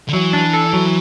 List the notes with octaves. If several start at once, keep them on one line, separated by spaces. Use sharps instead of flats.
D3
E3 F#3
D4
A4
F#3